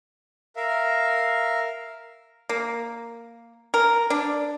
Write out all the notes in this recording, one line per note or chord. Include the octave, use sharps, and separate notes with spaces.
A#4 E5 F5
A#3
A#4
D4